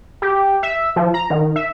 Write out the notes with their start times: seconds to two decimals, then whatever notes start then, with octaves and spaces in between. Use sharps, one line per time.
0.22 G4
0.63 E5
0.96 F3
1.14 A#5
1.30 D#3
1.56 E5